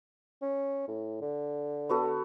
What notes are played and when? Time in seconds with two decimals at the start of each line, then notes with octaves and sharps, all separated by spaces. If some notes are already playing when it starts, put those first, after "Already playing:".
0.42 C#4
0.88 A2
1.21 D3
1.89 B3 F#4 A4